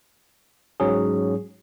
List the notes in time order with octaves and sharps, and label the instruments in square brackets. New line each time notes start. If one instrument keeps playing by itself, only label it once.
[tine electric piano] G#2 F#3 C#4 G#4